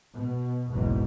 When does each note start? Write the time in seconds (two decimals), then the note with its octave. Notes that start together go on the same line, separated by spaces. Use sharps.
0.13 B2
0.71 F#1 B1 E2 G#2 B2